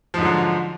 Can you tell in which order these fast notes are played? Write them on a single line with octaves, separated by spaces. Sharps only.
F3 G#2 D3 F#3